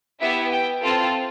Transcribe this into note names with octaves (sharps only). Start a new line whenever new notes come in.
B3 E4 G4 E5
G5
C4 F4 A4 A5